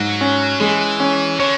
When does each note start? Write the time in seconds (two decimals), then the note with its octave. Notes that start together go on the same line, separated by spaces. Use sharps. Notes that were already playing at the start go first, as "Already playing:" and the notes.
Already playing: G#2 F#3
0.21 C#4
0.60 E3 G#3
1.00 C#4
1.40 D3 C#5